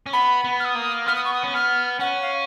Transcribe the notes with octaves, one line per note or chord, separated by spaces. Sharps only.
C#4
B3 B5
B3
F6
D#6
A#3
B3 F6
D#6
C#6
D#6
C#4
B3 F6
C#4 F#5
F5